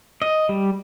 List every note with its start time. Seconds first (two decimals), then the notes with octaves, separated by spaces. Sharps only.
0.22 D#5
0.49 G3